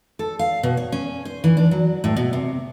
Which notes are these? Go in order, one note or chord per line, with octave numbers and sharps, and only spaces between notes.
A4
F5
B2
C#5
C#4
C5
E3
D4
F#3
A2
B2
C3